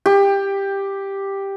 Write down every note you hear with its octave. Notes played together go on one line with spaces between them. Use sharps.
G4